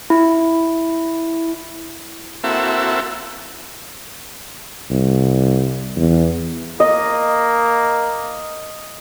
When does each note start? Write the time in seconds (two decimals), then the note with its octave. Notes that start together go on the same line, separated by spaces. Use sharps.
0.10 E4
2.44 A#3 C4 E4 F#4 A4 E5
4.91 C2
5.96 E2
6.80 A#3 D#5